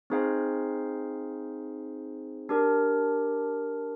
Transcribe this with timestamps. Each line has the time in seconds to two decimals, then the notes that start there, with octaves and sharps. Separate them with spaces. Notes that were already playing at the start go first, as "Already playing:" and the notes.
0.10 C4 D#4 G#4 C5 F5
2.49 D4 G4 A#4